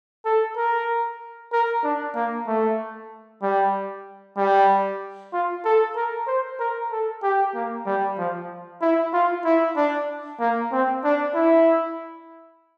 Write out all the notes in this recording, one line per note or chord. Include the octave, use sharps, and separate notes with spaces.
A4
A#4
A#4
D4
A#3
A3
G3
G3
F4
A4
A#4
C5
A#4
A4
G4
A#3
G3
F3
E4
F4
E4
D4
A#3
C4
D4
E4